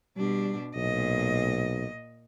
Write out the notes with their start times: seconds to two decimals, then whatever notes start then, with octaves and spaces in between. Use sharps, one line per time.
0.17 B2 G3 D4
0.76 B1 A#2 D#5